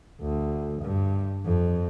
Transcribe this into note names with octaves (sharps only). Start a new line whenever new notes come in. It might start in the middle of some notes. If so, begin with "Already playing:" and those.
D2
G2
F2